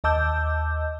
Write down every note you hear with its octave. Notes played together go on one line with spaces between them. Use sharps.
D#2 D#5 A5 D6 E6 G6